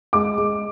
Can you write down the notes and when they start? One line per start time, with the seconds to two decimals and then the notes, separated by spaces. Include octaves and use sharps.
0.13 G#3 D6
0.38 G#3